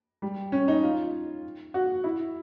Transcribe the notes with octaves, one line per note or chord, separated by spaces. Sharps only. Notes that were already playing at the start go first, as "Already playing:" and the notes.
G3
C#4
D#4
F4
F#4
E4